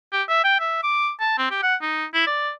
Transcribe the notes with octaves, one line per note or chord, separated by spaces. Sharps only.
G4
E5
G5
E5
D6
A5
C4
G4
F#5
D#4
E4
D5